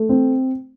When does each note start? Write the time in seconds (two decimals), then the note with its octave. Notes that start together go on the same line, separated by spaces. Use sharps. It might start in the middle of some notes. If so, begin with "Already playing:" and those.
Already playing: A3
0.09 C4